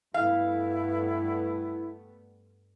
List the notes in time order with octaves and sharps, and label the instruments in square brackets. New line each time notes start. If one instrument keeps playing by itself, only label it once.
[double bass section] G2 A3 B3 [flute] E4 [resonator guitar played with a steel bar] F5